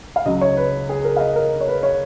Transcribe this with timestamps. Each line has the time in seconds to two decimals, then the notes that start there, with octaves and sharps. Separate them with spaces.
0.16 F5
0.26 C#2 C#3 F#3 D#5
0.41 C#5
0.57 B4
0.89 G#4
1.04 A#4
1.16 F5
1.20 D#5
1.36 A#4
1.61 C#5
1.68 B4
1.83 C#5